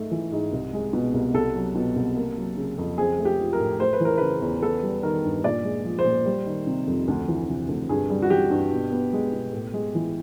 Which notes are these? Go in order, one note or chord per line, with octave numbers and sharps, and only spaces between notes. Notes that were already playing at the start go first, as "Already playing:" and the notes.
Already playing: G#2 A3
E3
G#2
C2
G#3
B2
C2
C2 A4
F#3
B2
C2
A#3
F#3
C#3
F2
C4 G#4
A3
G4
F3
A#4
A2
A3 C5
B4
E3 A#4
C#3 B4
E2
B3 A4
G3
D#3 A#4
G2
A#2 D5
G#3
F3
C5
A#2
G3
D#3
C3
F2
D2
E3
C3
D2
G2 G#4
G3
F#4
E3 G4
G2
B2
B3
G#3
B2
A2
G#3
E3